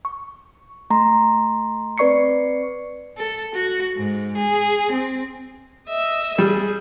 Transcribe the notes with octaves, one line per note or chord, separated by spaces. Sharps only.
C#6
A3 A#5 C6
C4 B4 D5 C#6 C7 C#7
A4
F#4
G#2
G#4
C4
D#5 E5
G3 G#4